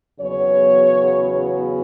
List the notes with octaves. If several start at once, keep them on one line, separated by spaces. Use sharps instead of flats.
E2 C#3 F#3 B3 C#5